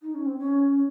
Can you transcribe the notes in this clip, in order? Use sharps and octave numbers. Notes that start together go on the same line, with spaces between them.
D#4
C#4
C4
C#4